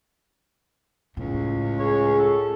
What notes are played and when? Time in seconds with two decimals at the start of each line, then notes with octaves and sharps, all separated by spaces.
1.17 C#2 A2
1.79 G#4 C#5
2.19 A4